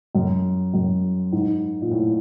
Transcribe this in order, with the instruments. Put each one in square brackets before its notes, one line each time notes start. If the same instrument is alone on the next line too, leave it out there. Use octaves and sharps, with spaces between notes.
[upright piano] F#2
F#2
G#2
A#2
A2